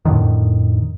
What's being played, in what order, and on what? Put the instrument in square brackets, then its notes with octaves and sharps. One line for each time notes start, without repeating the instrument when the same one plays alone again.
[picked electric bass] F2 A2 D3 D#3